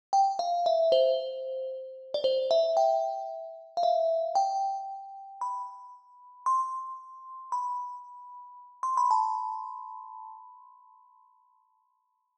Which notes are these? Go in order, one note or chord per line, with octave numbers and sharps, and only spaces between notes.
G5
F5
E5
C5
D5
C5
E5
G5
F5
E5
G5
B5
C6
B5
C6
B5
A5